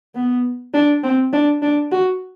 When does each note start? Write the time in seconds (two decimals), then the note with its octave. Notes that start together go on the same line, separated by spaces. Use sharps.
0.15 B3
0.74 D4
1.03 C4
1.33 D4
1.62 D4
1.92 F#4